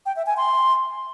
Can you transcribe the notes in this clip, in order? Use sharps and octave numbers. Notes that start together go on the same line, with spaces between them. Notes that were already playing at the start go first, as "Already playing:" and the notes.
G5
E5
G#5
C6